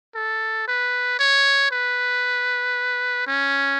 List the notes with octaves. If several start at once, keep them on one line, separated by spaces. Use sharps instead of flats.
A4
B4
C#5
B4
C#4